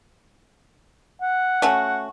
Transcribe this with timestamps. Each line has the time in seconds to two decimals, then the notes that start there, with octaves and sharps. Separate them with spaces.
1.21 F#5
1.62 A3 C#4 F#4